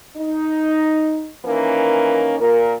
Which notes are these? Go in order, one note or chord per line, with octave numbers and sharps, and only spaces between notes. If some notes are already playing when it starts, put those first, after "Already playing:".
D#4
D#3 E3 A#3 C#4 A#4
A#2 A#4